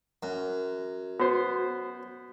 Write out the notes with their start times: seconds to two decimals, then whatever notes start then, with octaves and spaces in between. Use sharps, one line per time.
0.23 F#2
1.20 B3 F#4 C5